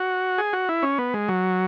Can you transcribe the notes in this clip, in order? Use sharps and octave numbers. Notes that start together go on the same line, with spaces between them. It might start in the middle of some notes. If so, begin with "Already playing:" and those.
Already playing: F#4
G#4
F#4
E4
C#4
B3
G#3
F#3